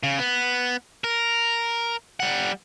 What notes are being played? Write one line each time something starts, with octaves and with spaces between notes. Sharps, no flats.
C#3
B3
A#4
G3 F#5